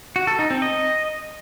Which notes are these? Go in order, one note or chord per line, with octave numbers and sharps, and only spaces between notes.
F#4
A4
D#4
C4
D#5